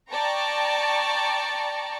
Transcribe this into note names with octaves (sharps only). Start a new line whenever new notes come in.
D5 G5 A5 A#5 C#6